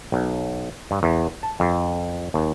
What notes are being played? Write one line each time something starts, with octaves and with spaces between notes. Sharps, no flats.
B1
G2
E2
A5
F2
D#2